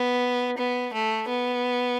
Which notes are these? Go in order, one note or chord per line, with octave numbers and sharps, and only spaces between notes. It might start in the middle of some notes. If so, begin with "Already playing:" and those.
Already playing: B3
B3
A3
B3